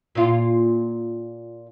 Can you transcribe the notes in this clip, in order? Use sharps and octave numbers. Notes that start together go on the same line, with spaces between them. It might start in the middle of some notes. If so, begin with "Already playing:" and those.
A#2 F4